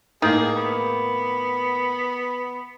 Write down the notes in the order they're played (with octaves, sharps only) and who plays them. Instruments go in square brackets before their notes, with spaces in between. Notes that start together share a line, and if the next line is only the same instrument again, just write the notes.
[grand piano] A2 A#3 [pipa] D#3 [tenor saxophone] G#4
[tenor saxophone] B3